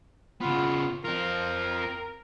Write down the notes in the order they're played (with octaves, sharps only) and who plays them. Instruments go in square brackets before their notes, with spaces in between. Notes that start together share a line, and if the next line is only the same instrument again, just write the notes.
[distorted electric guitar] C#3 B3 [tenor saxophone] F4
[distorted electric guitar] C4 F4 [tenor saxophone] A#4